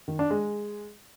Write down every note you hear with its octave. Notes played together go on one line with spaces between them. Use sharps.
D#3
D4
G#3